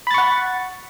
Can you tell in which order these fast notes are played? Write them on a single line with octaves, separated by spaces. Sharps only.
B5 A6 C#6 F#5